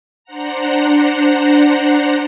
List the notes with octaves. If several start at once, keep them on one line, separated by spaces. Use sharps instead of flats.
D4 C5 F#5 A#5